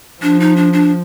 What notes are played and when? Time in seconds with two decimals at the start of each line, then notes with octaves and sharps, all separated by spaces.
0.22 F3 D4
0.40 D#4
0.56 D4
0.73 D4